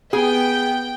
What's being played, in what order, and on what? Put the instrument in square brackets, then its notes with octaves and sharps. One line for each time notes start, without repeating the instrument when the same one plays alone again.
[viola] B3 [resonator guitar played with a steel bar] G#4 [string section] G5